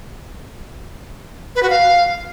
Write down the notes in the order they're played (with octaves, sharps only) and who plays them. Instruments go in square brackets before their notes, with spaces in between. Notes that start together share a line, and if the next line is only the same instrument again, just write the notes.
[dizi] B4
F#4
F5